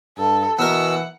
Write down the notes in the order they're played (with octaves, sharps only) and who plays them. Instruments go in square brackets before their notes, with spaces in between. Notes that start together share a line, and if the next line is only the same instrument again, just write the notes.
[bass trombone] G2 [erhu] A4
[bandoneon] B2 E6 [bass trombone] E3 [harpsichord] B3 A#4 [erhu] F#5